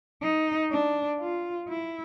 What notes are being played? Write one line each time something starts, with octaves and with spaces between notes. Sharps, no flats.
D#4
D4
F4
E4